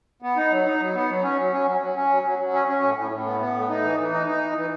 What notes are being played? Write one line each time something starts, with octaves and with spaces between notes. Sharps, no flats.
B3
D#4
F#3
D#4
F#3
B3
F#3
C#4
F#3
C#4
F#3
F#3
C#4
F#3
F#3
F#3
C#4
C#4
A2
A2
A2
B3
B3
A2
D#4
E3
E3
D#4
D#4
E3
E3